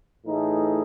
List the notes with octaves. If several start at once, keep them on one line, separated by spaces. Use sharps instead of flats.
A2 E3 A3 D#4 G#4